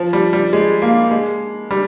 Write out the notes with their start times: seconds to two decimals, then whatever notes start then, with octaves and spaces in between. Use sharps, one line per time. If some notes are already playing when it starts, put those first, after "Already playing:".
Already playing: F3
0.13 G3
0.33 G3
0.53 G#3
0.82 A#3
1.11 G#3
1.71 G3